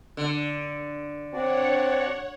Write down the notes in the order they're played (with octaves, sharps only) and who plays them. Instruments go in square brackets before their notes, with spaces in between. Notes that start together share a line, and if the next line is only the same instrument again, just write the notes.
[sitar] D3
[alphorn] C4 [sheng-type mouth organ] D4 F#4 D5 [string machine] C#5 F#5